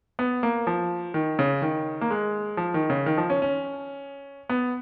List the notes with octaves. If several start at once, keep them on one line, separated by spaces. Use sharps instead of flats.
B3
A#3
F3
D#3
C#3
D#3
A#3
G#3
F3
D#3
C#3
D#3
F3
C#4
C#4
B3